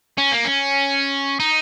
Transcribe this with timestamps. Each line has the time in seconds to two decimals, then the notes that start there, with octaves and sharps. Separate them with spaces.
0.18 C#4
0.32 A#3
0.45 C#4
1.40 D#4